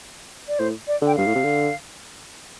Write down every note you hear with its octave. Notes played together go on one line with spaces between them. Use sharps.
D5
A2 C5
D5
D3 G5
G2 F5
A2
C3
D3